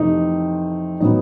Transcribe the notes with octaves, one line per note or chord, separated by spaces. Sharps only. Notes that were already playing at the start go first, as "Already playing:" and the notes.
Already playing: F2 C3 E3 A3 D#4
A2 F#3 B3 D#4